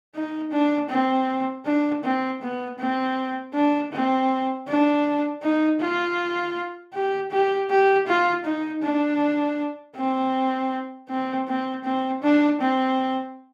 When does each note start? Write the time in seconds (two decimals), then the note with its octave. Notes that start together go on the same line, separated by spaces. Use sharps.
0.15 D#4
0.52 D4
0.89 C4
1.65 D4
2.04 C4
2.41 B3
2.79 C4
3.54 D4
3.92 C4
4.68 D4
5.43 D#4
5.80 F4
6.93 G4
7.31 G4
7.70 G4
8.07 F4
8.45 D#4
8.82 D4
9.96 C4
11.09 C4
11.48 C4
11.84 C4
12.22 D4
12.61 C4